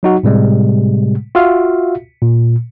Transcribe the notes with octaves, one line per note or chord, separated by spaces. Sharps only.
F#3 D#4 F#4
A2 C3 G3 G#3
F4 F#4 E5 F5
A#2